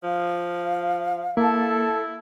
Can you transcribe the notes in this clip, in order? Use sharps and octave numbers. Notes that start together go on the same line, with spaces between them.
F3 F5
A#3 E4 A4